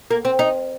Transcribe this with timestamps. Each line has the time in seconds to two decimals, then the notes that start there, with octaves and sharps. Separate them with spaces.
0.11 A#3
0.25 C4
0.39 D#4